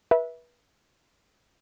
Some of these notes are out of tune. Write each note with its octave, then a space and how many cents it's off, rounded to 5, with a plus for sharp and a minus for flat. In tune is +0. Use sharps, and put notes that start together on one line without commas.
B4 -30 E5 -10